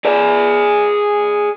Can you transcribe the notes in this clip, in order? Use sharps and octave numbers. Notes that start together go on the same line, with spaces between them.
G#4 D5